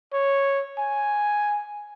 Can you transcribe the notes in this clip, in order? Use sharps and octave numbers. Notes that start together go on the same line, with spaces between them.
C#5
G#5